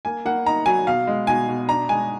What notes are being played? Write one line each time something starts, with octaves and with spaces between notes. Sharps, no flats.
A#3 G#5
A#3 F#5
D#4 A#5
F#3 G#5
B2 F5
G#3
B2 G#5
B2
D4 A#5
G#3 G#5